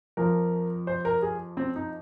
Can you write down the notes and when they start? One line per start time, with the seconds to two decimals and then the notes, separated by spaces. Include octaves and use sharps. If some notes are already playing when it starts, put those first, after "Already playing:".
0.17 F2 F3 A#4
0.87 C5
1.05 A#4
1.22 G#4
1.57 C4
1.76 D#4